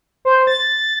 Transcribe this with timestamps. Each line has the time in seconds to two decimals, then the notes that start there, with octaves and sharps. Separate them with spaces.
0.25 C5
0.47 A6